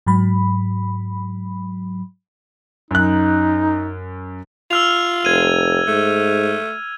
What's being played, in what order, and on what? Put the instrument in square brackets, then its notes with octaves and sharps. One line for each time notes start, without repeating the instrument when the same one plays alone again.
[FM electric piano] G#2 F#3 B5
[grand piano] F#2 F#6 [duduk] D#4
[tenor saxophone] F4 [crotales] E6 F6 F7
[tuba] F1 [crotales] G#6 D#7
[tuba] G#2 [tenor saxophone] A3